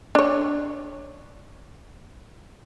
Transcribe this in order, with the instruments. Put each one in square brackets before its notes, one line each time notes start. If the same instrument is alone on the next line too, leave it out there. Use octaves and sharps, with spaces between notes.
[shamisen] D4 C#5